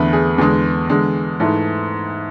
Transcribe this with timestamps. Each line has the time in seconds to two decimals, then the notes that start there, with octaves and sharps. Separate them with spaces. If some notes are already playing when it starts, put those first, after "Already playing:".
Already playing: E2 D3 A3 B4
0.13 G#4
0.38 E2 D3 G#3 G#4
0.90 E2 D3 G#3
1.40 G#2 E3 A3